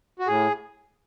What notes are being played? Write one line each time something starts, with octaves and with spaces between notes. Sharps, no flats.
F#4
A2 G#4